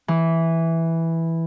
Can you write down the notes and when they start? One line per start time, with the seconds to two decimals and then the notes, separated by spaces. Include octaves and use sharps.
0.08 E3